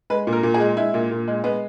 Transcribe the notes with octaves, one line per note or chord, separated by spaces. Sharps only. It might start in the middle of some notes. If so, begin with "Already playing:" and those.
G#3 B4
A#2
A#4
A#2
G#4
G#3
G#3 E4
A#2
A#2
G#3
G#3 B3